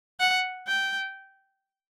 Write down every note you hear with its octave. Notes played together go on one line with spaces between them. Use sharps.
F#5
G5